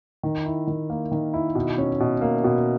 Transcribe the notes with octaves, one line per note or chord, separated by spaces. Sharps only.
D#3
E4
D#3
A#3
D#3
E4
B2
C#4
B2
A#3
B2